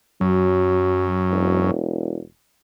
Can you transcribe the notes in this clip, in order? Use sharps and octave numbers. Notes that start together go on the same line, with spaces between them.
F#2 F#3
E1